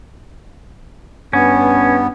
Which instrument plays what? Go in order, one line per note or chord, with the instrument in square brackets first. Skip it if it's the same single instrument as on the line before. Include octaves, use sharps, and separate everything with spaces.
[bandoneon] G2 B3 [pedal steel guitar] C#4